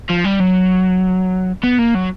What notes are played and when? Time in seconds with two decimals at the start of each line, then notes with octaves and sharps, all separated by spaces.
0.10 F3
0.25 G3
0.40 F#3
1.64 B3
1.79 A#3
1.95 F#3